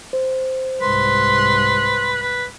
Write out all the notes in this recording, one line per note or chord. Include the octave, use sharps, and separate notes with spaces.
C5
C2 G#2 B4 C6
B4